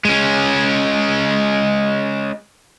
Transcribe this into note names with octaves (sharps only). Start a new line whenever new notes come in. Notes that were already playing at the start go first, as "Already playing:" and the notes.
G#3 C#4